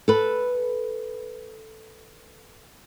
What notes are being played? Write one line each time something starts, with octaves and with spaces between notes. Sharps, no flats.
A4 B4